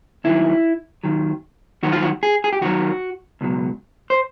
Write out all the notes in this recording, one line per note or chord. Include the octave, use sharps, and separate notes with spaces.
D#2 D#3 F#3 E4
D#2 D#3 F#3
D#2 D#3 F#3 F#4
F4
F#4
G#4
G#4
G4
D#2 D#3 F#3 F#4
C#2 B2 F#3
C5